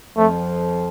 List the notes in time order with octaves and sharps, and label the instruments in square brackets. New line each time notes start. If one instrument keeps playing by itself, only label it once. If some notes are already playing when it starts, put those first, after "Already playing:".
[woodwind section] F2 F3 [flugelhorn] A3